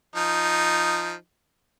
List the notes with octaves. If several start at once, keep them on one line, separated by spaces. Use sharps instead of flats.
F3 D#4